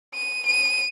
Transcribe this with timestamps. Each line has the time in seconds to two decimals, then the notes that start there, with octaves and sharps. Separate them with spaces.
0.15 D#7
0.47 D#7